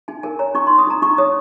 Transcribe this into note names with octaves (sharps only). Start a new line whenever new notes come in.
D#4 G#5
A#4 G#5
C#5 A#5
D#4 C#6
D#4 C6
D#6
D#4 A#5
D#4 C#6
C#5 D#6